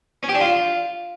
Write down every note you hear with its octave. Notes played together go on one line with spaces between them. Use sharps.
C#4
G4
D4
F4